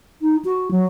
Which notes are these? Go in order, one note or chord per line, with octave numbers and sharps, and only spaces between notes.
D#4
F#4
F#3